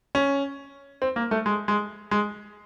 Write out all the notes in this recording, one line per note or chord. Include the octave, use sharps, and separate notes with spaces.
C#4
C4
A#3
A3
G#3
G#3
G#3